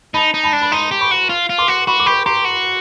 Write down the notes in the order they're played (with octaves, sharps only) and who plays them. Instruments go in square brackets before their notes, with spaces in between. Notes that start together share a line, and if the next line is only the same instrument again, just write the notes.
[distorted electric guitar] D#4 [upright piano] A5 B5
[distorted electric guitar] D#4
[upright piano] A5 B5
[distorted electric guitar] D4
[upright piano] B5
[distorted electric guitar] D#4 [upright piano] A#5 C6
[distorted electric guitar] G4
[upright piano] B5 C#6
[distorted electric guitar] F#4
F4
F4
[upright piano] C6 D6
[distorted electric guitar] F#4
[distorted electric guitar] F#4 [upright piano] B5 C#6
[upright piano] D6
[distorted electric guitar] G4 [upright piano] B5 C#6
[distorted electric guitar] G4 [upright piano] A#5 C6
[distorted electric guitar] F#4